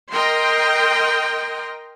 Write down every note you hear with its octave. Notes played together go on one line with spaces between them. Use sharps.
A#4 D#5 G5 C6